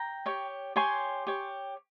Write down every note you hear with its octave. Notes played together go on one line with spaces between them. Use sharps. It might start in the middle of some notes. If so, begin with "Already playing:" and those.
Already playing: G5 A#5
G4 C#5
G4 C#5 G#5 C6
G4 C#5